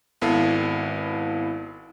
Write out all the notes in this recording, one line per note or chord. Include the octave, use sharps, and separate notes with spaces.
G#1 B3 E4 A4 F5